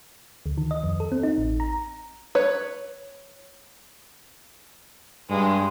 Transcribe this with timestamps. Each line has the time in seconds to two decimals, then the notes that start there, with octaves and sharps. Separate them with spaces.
0.46 D2
0.58 D#3
0.71 D#5
0.83 F2
1.00 A4
1.12 C4
1.23 D#4
1.38 A1
1.60 A#5
2.35 B4 C#5
5.30 G2 G#3